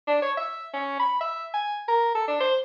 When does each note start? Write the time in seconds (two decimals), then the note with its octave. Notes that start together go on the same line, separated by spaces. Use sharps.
0.08 D4
0.22 C#5
0.37 E5
0.74 C#4
0.99 B5
1.21 E5
1.54 G#5
1.88 A#4
2.15 A4
2.28 D4
2.40 C5